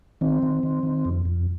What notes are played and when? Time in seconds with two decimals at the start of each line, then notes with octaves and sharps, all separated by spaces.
0.21 D#3 C4
0.43 D#3
0.63 D#3
0.83 D#3
1.05 F2
1.25 F2